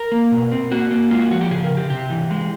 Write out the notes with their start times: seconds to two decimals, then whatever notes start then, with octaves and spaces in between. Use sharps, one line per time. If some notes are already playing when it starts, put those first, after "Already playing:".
Already playing: A#4
0.12 A#3
0.32 B2
0.52 C4
0.71 A#3 F#4
0.91 A#3
1.11 G#3 F4
1.21 F#4
1.31 F3 F#4
1.41 G4
1.51 C#3 G#4
1.64 A#4
1.71 C#3
1.77 G4
1.90 C3 G4
2.10 E3
2.30 G#3